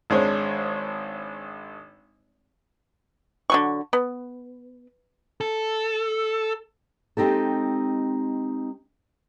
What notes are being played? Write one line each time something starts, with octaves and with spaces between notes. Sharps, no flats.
G#1 G#3 D4 C5 C#5
D3 F#3 C#6
B3
A4
G#3 C4 D#4 G4 A4